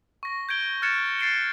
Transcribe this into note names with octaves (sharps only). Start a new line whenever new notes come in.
C#6 A#6
G6 G#6 D7 G7
F6 F#6 G#6 A6 C#7 E7
A6 C7 D7 G7